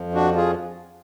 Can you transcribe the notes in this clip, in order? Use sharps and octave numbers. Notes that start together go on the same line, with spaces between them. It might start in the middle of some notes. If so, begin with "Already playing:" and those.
Already playing: F2 F3
D4 F#4
F4 G#4